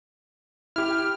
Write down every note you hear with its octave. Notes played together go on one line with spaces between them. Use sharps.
E4 G4 G5 F6